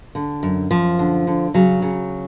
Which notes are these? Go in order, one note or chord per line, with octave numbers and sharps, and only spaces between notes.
D3
F#2
F#2 F3
D3
D3
C#3 F#3
C#3